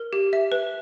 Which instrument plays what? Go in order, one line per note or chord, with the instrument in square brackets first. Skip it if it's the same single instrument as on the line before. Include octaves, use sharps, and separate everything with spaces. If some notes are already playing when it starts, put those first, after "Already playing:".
Already playing: [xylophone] A#4
G4
E5
B4